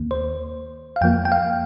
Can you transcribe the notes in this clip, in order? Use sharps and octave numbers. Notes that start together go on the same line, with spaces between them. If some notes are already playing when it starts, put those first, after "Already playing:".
Already playing: D#2 D#3 A#3
C5
F5
F2 F3 A#3 G5
G5
F5